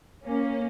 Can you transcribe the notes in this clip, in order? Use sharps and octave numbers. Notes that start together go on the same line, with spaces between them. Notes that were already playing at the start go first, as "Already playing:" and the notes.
A#3 C#4